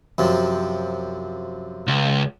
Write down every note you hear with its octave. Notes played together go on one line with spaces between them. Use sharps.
F#2 C3 F3
C#2